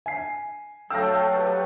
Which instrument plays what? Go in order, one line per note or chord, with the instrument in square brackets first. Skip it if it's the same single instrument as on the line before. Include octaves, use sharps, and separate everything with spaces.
[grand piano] G#5 C7
[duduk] F#3 [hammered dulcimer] A3 F5 G5 [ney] A4 [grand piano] E6 A#6
[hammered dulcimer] G4 A4 [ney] B4